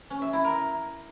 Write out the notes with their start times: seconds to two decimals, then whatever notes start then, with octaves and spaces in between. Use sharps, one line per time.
0.10 C#4
0.22 E5
0.33 E4
0.44 A#4